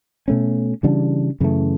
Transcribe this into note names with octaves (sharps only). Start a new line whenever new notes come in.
B2 A3 C#4
C#3 E3 G3 D4
F#2 C#3 E3 A3